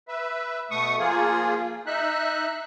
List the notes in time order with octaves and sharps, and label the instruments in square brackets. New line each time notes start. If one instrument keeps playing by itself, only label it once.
[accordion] B4 E5
B2 A3 C#6 D#6
F3 A#3 F4 G#4
D#4 E5 F#6